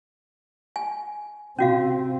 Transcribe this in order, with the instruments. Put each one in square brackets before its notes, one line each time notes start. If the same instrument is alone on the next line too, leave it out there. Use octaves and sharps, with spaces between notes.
[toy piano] G#5
[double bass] C3 C4 [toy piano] C#4 F#4 F5